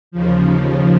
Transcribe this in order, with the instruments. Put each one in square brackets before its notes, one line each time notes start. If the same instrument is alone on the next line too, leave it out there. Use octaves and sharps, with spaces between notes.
[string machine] D#2 C#3 F3